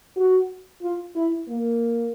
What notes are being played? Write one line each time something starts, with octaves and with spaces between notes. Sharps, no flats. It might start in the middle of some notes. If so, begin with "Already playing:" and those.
F#4
F4
E4
A#3